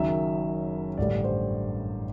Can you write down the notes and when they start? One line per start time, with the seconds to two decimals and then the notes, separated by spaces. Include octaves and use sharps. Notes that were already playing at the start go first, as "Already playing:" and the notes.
Already playing: F#1 F#2 D#3 F#3 E5
0.98 A1 G2 D3 G3 D5
1.24 C5